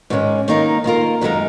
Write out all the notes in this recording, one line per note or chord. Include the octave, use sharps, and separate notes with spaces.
G#2 D#3 G#3 C#4
D#3 A#3 D#4 A#4
D#3 A#3 F4 A#4
F#2 D#3 G#3 D#4 A#4